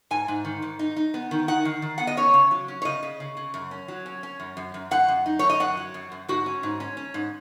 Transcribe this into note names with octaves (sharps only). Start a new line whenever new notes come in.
G#2 G#5
G#2
D#3
G#2
D#4
D#4
B3
D#3
D#4 F#5
D#3
D#3
B3 F#5
D#5
C#4 C#5
C#3
F#3
C#4
C#5
C#3 D#5
C#3
C#3
C#3
F#2
C#4
F#3
C#4
C#4
F#2
F#2
F#2
F#2 F#5
F#2
D#4
F#2 C#5
D#5
F#2 F#5
F#3
F#2
F#2
G#2 F#4
C#4
G#2
C#4
C#4
G#2